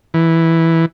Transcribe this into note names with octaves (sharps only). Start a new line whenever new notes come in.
E3